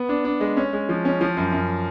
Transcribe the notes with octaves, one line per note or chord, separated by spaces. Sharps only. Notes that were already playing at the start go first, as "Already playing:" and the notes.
Already playing: B3
D4
D4
G#3
C#4
G#3
F3
C#4
F3
F#2
F#2